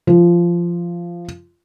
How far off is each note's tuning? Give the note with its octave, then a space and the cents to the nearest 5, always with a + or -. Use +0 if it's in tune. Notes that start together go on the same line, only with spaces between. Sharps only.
F3 -15